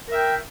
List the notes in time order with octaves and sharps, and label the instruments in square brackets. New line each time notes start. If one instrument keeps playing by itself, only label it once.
[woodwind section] A#4
E5
G5